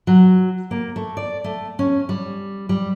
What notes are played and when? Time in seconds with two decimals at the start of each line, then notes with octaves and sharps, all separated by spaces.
0.07 F#3
0.71 A#3
0.96 A3
1.17 D5
1.44 A3
1.79 C#4
2.09 G3
2.69 G3